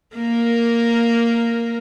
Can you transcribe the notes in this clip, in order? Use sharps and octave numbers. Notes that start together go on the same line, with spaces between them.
A#3 A#4